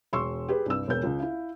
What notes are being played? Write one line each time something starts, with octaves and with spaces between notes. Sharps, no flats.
E1 C6 C#6 E6
G4 G#4 B4
C2 G2 E6
E1 B2 A#4 G6
C#2
E4 F5